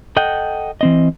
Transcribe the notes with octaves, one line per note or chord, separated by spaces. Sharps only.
A4 D#5 F#5 G5
E3 C4 D#5